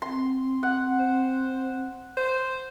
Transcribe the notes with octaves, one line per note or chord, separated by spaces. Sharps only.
C4 C6
F#5
C5
C5